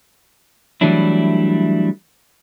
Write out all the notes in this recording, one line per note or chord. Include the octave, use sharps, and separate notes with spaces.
E3 F#3 G3 A3 D4 E4